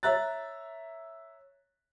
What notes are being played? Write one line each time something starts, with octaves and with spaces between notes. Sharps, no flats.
C#5 E5 A#5 F#6 A6